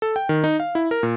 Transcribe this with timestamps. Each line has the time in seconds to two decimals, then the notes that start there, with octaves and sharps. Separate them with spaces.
0.02 A4
0.16 G5
0.29 D#3
0.44 D#4
0.60 F5
0.75 E4
0.91 A#4
1.03 A#2